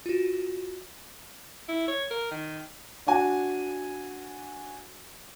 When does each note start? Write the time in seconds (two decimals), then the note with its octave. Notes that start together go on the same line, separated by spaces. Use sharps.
0.06 F4 F#4
1.69 E4
1.88 C#5
2.10 A#4
2.31 D#3
3.07 D4 F#4 G#5